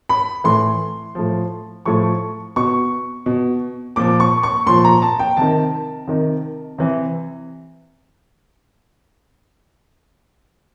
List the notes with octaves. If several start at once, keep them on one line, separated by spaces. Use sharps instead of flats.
B5
A2 E3 C6
A2 F3
A2 F3 C#6
B2 C#6
B2
A#2 F3 D6
C#6
C#6
A#2 F3 C6
A#5
A5
G5
C3 D#3 A5
C3 D#3
C3 E3